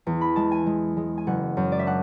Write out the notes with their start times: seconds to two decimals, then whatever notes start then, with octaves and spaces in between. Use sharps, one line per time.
0.06 E2
0.21 B5
0.36 G#3 A5
0.51 G#5
0.66 G#3
0.97 G#3
1.18 G#5
1.27 F#1 F#5
1.57 F#2
1.72 D5
1.79 E5
1.87 D4 F#5